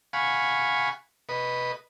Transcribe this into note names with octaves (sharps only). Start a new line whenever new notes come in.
F5 F#5 G#5 B5 C#6
B4 D#5